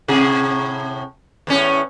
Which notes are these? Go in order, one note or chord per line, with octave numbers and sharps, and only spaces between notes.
A2 C3 G#4
E2 A2 C#4